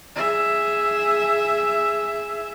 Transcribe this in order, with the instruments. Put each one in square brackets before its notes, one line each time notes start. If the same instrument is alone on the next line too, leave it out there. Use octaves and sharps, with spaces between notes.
[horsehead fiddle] G#4 E5